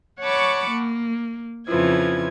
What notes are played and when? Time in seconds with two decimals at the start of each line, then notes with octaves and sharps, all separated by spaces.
0.21 C#5 F#5 A5 B5 C#6 D6
0.71 A#3
1.67 F2 C#3 E3 F3 G#6